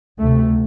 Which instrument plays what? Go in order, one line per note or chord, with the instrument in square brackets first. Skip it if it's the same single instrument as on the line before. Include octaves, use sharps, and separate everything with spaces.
[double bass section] D2 C3 A3